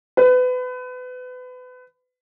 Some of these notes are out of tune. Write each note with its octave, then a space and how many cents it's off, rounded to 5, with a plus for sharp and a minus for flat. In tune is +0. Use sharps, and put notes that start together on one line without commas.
B4 +30